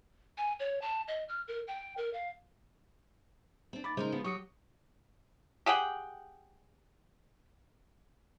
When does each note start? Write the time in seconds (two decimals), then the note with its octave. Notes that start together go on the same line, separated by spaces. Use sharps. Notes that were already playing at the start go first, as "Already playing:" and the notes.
0.38 G#5
0.60 C#5
0.82 A5
1.08 D#5
1.29 F6
1.48 A#4
1.67 G5
1.97 A#4
2.13 F5
3.73 C4 D4
3.84 D#2 B5 D6 A6
3.97 C#3 G#3 D#4 A#4 C5
4.12 F3 G#3 B3
4.24 F#3 F#4 G4 C#6 D#6 C#7
5.66 G4 G#4 F#5 G5